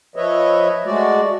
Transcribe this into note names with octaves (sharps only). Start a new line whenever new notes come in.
F3 B4 C#5 D#5 E5
G#3 A3 F#4 D5